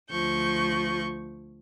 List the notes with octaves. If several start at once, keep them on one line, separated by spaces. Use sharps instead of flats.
D2 F3 C#6 G6